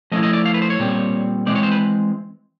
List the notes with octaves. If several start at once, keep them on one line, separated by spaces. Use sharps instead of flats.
F3 A3 C#4 E4 D#5
D#5
D5
F5
B4
C5
C#5
A#2 G3 C4
E3 G#3 C4 D5
C#5
C5
B4